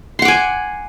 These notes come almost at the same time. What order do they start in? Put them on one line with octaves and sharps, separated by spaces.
C6 F#5 D6 G#5